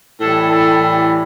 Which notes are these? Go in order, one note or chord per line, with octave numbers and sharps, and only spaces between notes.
A2 E3 G3 A4
A4
A4